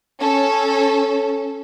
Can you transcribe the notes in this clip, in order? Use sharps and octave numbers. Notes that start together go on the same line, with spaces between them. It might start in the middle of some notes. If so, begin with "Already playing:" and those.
C#4 A4